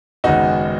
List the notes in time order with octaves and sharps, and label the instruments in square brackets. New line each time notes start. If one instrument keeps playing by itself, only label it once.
[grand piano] G#1 F#2 C#3 G#3 B3 D#4 F#4